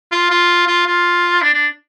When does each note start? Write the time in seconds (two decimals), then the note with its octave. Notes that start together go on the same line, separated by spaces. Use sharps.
0.12 F4
0.31 F4
0.67 F4
0.87 F4
1.42 D4
1.54 D4